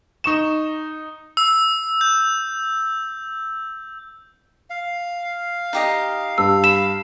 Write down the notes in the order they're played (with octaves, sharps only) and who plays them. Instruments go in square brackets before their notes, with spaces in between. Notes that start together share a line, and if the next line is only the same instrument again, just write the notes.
[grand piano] D#4 C#6 E7
[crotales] E6
G6
[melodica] F5
[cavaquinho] D#4 G4 D#5
[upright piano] G2 [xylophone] E6
[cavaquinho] B5 [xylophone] E7